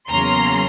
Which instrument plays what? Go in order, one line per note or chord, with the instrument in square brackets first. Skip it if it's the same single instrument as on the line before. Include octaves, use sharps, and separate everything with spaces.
[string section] E2 C#3 F#3 A#3 C#4 A#5 C6